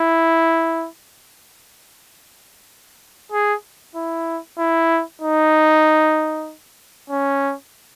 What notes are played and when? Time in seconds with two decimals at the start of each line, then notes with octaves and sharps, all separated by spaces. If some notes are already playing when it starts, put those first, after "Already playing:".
Already playing: E4
3.32 G#4
3.95 E4
4.58 E4
5.22 D#4
7.10 C#4